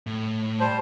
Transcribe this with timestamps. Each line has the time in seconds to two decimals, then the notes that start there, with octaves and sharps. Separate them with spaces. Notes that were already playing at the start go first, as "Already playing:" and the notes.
0.07 A2
0.60 G3 C5 A5